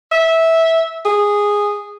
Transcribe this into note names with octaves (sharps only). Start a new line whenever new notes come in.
E5
G#4